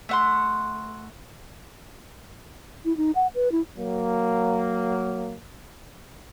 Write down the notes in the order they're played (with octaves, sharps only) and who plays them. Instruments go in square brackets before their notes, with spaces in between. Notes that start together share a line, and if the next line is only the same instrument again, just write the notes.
[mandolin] A3 F#5 C6
[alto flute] E4
D#4
F#5
B4
E4
[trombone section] F#3 A#3